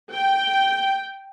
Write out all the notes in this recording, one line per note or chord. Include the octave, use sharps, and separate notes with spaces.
G5